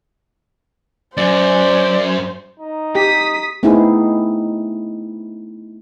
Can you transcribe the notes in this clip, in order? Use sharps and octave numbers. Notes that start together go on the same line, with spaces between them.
F#2 C5 D5
D#4
G4 D#6 B6
A3 B3 C4 D#4 E4 G#4